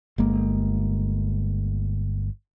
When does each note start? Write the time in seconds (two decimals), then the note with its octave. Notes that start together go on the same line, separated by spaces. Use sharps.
0.18 G1 G#3 A#3